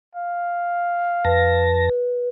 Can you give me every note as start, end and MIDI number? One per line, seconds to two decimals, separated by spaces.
0.15 1.65 77
1.25 1.89 41
1.25 2.29 71
1.25 1.89 81
1.25 1.89 94